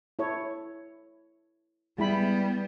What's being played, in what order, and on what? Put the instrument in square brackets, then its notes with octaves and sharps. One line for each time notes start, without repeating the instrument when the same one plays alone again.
[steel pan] E4 A4 C#5
[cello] G3 B3 [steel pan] G#3 E4 B5